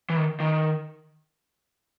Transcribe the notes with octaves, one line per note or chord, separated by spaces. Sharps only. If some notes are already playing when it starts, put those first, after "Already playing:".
E3
D#3
D#3